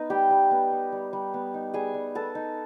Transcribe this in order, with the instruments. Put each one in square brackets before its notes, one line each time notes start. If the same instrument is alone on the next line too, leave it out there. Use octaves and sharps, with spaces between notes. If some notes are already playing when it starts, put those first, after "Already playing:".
Already playing: [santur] B3 D#4
G3 G4 G5
G3
B3
D#4
G3
G3
B3
D#4
G3 G#4 G#5
G3
B3 A4 A5
D#4